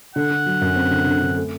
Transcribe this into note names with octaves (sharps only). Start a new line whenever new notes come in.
D3 F#5
D3
F#3
F#2
C4
D3
D3
D3
A3